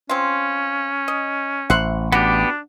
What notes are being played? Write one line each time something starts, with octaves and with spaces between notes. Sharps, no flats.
C4 C#4 F4
D#5
A1 C5 E5 F#5
B3 D4 F#4 G4